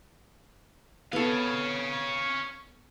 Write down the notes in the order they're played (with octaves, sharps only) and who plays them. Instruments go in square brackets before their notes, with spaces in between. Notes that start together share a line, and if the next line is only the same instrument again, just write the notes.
[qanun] B3 A4 [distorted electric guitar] C#5 F5